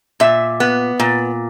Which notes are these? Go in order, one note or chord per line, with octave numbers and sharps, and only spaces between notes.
A#2 E5
B3
A#2